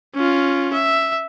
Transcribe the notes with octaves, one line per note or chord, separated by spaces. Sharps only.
C#4 F4
E5